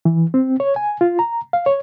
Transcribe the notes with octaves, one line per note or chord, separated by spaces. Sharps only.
E3
C4
C#5
G#5
F4
A#5
F5
C#5